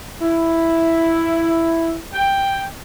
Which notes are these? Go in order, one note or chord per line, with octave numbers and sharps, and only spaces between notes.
E4
G5